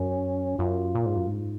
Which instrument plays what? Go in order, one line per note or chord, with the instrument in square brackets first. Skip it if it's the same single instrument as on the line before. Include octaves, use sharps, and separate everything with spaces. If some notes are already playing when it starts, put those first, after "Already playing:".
Already playing: [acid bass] F#2 [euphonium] C#4
[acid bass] F#2 [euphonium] F4
[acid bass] A#2
G#2
F#2
G#2